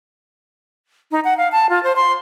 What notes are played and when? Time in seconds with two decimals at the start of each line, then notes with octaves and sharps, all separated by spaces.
1.12 D#4
1.25 F#5
1.37 F5
1.52 A5
1.70 F4
1.83 C5
1.96 C6